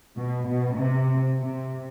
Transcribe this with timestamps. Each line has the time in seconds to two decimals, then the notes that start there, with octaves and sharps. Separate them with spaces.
0.17 B2
0.48 B2
0.78 C3
1.39 C3